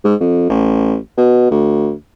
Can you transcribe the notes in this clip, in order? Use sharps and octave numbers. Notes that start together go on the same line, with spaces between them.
G#2
F2
A1
B2
D2